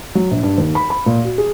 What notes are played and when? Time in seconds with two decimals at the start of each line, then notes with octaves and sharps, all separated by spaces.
0.15 F#3
0.31 A#1
0.43 G2
0.58 D#2
0.75 B5
0.90 B5
1.06 A#2
1.25 F#4
1.38 G#4